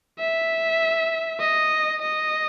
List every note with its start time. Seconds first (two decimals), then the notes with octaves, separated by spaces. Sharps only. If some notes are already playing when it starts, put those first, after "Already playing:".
0.19 E5
1.40 D#5
2.02 D#5